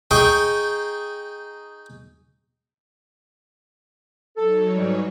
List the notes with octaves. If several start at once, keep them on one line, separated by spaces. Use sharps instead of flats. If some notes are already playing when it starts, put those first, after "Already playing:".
D#4 G#4 G5 G#5 C#6
F#3 D#4 A4 C#5
G#2 E3 G3